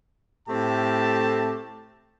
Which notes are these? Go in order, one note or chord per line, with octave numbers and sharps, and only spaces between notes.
A2 A3 C4 G4 A5